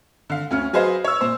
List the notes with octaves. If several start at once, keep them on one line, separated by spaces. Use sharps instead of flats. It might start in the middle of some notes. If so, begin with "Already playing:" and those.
D3 F5
D2 C#4 F6
F#3 G#4 B4 C5 D#5 F5
C#5 E6
A#2 C5